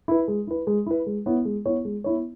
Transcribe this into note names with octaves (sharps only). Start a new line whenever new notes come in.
E4 B4
G#3
E4 B4
G#3
E4 B4
G#3
B3 E4 C#5
G#3
B3 E4 C#5
G#3
B3 E4 C#5